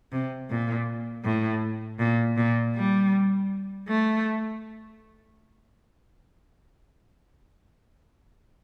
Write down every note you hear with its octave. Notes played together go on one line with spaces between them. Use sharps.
C3
A#2
A2
A#2
A#2
G3
A3